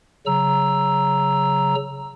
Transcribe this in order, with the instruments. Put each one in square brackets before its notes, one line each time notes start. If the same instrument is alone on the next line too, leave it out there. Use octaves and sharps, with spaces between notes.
[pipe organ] C#3 F#3 A#5 E6